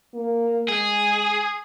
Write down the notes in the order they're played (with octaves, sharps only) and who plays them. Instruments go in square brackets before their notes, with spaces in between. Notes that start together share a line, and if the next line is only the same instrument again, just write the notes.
[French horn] A#3
[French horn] G#3 [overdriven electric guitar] G#4